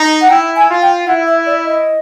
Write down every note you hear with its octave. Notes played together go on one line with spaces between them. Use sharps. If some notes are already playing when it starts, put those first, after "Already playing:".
Already playing: D#4
F#5
E4 G5
G#5
F4
G5
E4 F#5
E5
D5
D#5